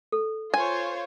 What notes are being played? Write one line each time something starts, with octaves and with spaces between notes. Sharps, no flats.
A4
F4 C5 C#5 G#5